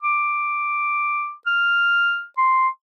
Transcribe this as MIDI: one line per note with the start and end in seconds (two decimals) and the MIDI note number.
0.03 1.32 86
1.46 2.24 89
2.38 2.68 84